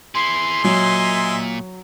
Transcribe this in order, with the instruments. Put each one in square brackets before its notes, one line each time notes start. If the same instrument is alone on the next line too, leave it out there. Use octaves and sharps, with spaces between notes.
[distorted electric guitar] E4 G#4 [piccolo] C6
[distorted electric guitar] A#2 [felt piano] F#3 [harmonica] D#5 E5 G#5